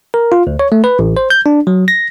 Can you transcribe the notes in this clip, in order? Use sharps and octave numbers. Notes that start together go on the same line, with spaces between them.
A#4
F4
D2
C#5
A3
B4
A1
C5
G6
D4
F#3
A#6